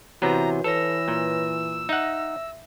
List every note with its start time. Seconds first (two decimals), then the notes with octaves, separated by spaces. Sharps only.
0.22 C3 E3 B3 F#4 C#5 A#5
0.64 E3 A4 B4 C#5 E6 A#6
1.08 A#2
1.89 D#4 E5 F#5